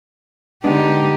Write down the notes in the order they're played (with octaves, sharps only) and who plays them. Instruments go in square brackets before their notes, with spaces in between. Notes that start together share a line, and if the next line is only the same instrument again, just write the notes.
[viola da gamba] D3 D#4 G4 [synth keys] G#3 B3 D4